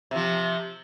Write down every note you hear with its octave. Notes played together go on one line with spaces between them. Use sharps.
C3 F3